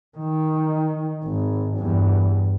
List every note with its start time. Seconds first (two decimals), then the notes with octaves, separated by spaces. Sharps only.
0.18 D#3
1.25 G#1
1.77 E2 G2